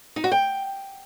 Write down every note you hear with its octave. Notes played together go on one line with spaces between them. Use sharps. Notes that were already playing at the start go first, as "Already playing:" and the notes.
D#4
F#4
G5